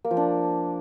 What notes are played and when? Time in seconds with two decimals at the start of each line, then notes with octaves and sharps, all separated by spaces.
0.05 A#3
0.11 F3
0.17 D4